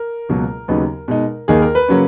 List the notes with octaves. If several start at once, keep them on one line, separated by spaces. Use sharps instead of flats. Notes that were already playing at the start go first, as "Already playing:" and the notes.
Already playing: A#4
C#2 B2 F#3 A#3
D#2 C#3 F#3 B3 D#4
B2 G#3 D#4
D#2 D#3 A#3 D#4 G#4
A#4
B4
C#3 F#3 A#3 C#4